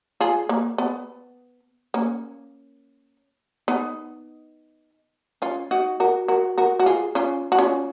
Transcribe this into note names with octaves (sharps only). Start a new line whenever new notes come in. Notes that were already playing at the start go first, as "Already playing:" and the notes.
F4 G#4
A#3
B3
A#3 C#4
B3 D#4
C#4 F4
D#4 F#4
F#4 A#4
F#4 A#4
F#4 A#4
F#4
F4 G#4
C#4 F4
F#4
C#4 F4